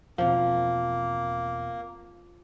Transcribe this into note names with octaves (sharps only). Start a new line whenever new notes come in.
E2 B2 F3 A#3 C4